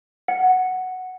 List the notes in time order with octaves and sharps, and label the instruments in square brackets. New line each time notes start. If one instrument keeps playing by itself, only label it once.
[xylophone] F#5